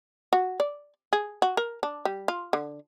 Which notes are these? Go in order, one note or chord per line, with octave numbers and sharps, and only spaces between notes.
F#4
D5
G#4
F#4
A#4
D4
G3
F4
D3